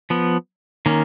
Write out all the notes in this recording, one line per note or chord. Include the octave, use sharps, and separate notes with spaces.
F3 B3
D#3 A#3 C#4